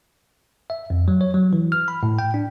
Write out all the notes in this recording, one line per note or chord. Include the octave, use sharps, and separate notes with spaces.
E5
F2
F#3
C#5
F#3
E3
F6
B5
A2
G5
D4